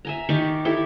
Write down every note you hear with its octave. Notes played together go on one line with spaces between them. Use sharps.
E5 G#5 A#5
D#3 G4 D5 C#6
E4 G4 A4